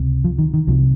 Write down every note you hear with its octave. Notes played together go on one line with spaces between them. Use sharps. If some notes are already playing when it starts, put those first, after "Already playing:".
Already playing: C#2 C3
F3
D#3
D#3
C2 C3 F3